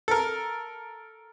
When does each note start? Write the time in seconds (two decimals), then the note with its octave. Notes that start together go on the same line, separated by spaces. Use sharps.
0.08 A4 A#4